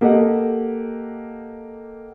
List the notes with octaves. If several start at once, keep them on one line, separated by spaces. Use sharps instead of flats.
A#3 G4 A4 D#5 F#5